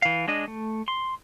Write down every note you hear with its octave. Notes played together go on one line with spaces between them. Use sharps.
E3 F5
G#3 D4 D#5
A3
C6